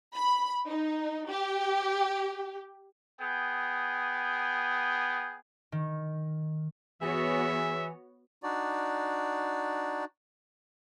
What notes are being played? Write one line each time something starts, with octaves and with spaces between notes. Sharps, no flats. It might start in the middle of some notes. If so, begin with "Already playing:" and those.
B5
D#4
G4
B3 G#4 G5
D#3
E3 B3 F#4 G#4 C#5 E5
D4 D#4 F#4 D5